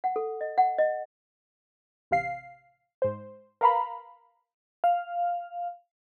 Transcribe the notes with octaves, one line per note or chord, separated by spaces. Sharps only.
F#5
A4
D#5
F#5
D#5
A1 C3 F5 C7
G#2 C5
A#4 B4 F5 A#5 B5
F5